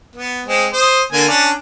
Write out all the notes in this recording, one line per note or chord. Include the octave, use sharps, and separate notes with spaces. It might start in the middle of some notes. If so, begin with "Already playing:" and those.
B3
G#3 C4
C5 D#6
D3 A#3 G#5
C#4 D4 D5